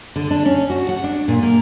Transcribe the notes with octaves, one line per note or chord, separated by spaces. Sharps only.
D3
D4
C#4
F#4
F#5
D4
A#2
A#3